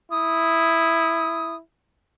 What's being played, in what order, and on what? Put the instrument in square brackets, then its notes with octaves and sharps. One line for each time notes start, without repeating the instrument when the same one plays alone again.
[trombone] E4 [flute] D#6